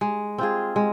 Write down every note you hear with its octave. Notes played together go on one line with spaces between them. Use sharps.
G#3
C4 F4 G#4
G#3